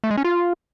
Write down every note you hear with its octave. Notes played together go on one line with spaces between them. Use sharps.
A3
G#3
C#4
F4